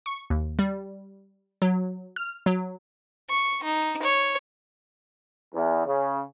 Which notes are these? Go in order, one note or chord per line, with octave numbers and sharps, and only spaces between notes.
C#6
D#2
G3
F#3
F6
F#3
C#6
D#4
C#5
E2
C#3